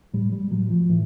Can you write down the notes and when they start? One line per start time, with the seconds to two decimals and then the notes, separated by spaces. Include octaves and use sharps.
0.13 A2 G3
0.32 G3
0.51 A2 F#3
0.70 F3
0.89 A2 E3